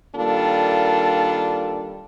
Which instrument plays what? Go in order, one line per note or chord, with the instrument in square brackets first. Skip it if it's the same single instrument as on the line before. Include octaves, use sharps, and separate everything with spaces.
[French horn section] D#3 G3 A#3 D4 F4 A4